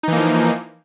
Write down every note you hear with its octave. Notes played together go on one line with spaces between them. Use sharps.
E3 F3 A#3 D#4